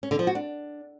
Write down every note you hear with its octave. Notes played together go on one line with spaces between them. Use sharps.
C#4
D3
F3
F#4
D4